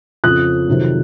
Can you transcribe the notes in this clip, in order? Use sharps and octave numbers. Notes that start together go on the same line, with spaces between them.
F2 C#3 F3 D#6 F#6
F2 C3 D#3 F#3